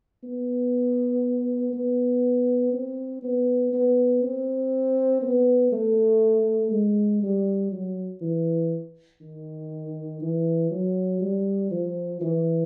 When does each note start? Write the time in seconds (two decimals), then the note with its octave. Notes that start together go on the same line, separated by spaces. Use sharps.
0.23 B3
1.73 B3
2.73 C4
3.23 B3
3.73 B3
4.23 C4
5.22 B3
5.72 A3
6.71 G#3
7.22 G3
7.72 F#3
8.21 E3
9.21 D#3
10.22 E3
10.71 F#3
11.21 G3
11.71 F3
12.21 E3